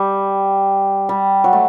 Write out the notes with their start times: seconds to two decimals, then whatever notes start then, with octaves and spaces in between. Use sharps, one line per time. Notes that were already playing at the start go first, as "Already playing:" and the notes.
Already playing: G3
1.09 G3
1.44 F#3
1.53 A3